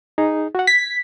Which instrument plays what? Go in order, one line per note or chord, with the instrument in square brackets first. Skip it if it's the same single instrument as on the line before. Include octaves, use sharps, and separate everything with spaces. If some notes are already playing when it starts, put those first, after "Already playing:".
[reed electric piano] D#4 G#4
F#4 F#5
[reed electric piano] G#6 [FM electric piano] B6